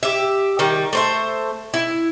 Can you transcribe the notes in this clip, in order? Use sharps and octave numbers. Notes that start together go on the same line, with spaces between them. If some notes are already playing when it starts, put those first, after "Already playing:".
G4 E5
D#3 G3
A3 C5 E5
E4